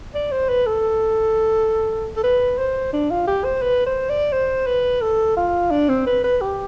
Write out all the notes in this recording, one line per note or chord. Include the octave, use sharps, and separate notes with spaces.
D5
C5
B4
A4
A4
B4
C5
D4
F4
G4
C5
B4
C5
D5
C5
B4
A4
F4
D4
C4
B4
B4
G4